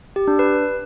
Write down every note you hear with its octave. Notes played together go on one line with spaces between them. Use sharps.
G4
D4
B4